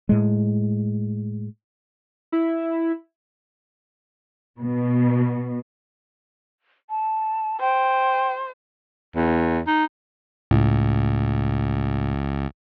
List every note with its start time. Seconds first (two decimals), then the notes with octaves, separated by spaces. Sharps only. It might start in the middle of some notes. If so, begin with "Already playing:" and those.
0.09 A2 G#3
2.32 E4
4.59 B2
6.90 A5
7.60 C5 G5
9.16 E2
9.67 D#4
10.51 C#2 A2